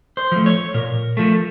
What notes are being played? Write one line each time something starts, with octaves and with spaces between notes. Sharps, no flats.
C5
F3 A3
C#5
A#2 A#4
F3 A3